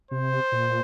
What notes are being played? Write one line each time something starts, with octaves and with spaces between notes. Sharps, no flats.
C3 C5
A#2